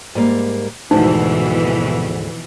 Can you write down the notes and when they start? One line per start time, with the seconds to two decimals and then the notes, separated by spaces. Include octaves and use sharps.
0.15 G#2 G3 A#3
0.91 D2 G#2 B2 E3 F3 D#4